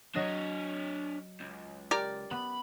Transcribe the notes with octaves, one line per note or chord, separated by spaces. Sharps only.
F#3 D4 C#5 D#5 A6
C#2
G4 A#4 D5
B3 B5